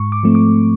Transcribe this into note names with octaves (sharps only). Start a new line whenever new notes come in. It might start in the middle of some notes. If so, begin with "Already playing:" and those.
Already playing: G#2 C#6
D6
F3 A3 C4
D6